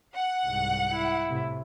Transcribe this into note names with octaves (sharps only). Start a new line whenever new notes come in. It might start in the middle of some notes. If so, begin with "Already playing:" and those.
F#5
C2 G#2
E4
A2 C3